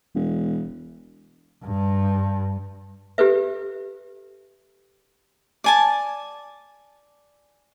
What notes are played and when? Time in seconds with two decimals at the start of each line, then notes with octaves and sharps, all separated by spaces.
0.15 E1
1.64 G2
3.18 G4 A4 B4 E5
5.64 D5 G#5 A5